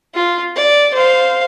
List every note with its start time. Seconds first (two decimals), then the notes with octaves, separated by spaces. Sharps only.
0.15 F4
0.56 D5
0.94 C5 F5